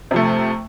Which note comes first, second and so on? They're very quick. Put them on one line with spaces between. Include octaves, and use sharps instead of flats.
C3 F3 A3